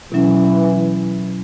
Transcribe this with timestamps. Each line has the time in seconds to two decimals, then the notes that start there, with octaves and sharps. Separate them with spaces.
0.12 B2 E3 F#3 C#4